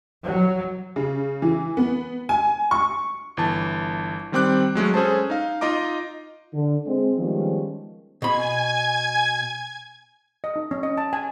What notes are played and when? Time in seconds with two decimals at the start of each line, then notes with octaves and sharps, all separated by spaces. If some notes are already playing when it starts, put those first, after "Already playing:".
0.24 F#3
0.96 C#3
1.42 E3
1.77 B3
2.29 G#5
2.71 C#6
3.37 G1 E3 A5
4.32 D#3 G3 C4 G5 D6 F#6
4.75 F#3 G#3 A3 C#4
4.94 C#4 G#4 A4 C5 A5
5.30 D#4 F5
5.61 D#4 F4 D#5 A#5 D6
6.54 D3
6.87 G#3 C4
7.18 D#3 F3 G3 G#3 B3 C#4
8.22 B2 G#5 B5 G#6
10.44 D#5
10.56 D#4
10.71 C#4
10.83 D#5
10.98 A5
11.13 G#5